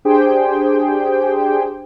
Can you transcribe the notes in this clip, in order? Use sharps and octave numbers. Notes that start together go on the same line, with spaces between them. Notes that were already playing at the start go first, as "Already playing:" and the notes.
D4 G4 G#4 C5 G5